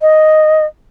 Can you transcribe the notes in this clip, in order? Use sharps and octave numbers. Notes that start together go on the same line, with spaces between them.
D#5